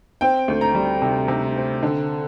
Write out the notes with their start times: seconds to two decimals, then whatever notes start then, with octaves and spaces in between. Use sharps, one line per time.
0.21 C4 G5
0.48 D2
0.61 A#5
0.75 G3
1.02 C3
1.28 C3
1.56 C4
1.83 D3